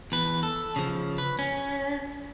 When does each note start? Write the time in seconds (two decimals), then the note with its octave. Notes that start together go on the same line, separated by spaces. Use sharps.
0.12 E2 B4
0.43 A4
0.76 C#3 F3
1.18 B4
1.39 C#4